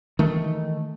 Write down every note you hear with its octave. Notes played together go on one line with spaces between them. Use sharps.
D#3 E3 A3